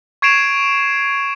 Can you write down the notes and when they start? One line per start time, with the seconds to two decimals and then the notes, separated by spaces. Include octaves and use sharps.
0.22 C#6 G#6 C7 D7 E7 F7